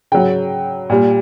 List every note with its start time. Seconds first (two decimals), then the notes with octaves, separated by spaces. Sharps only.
0.12 C#3 F#3 G5
0.90 A#2 G3